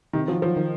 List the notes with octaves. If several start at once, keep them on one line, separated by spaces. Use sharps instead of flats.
C3 D#3
F3 F#3
F3 F#3
D#3